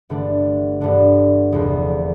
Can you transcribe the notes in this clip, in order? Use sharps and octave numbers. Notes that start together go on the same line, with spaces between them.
G1 G2 D3 A3 D4
G1 G2 D3 A3 D4
F1 E2 D3 F3